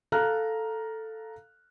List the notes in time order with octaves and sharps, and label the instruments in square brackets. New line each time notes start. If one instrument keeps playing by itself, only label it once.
[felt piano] A4 F5 A#5 F6 F#6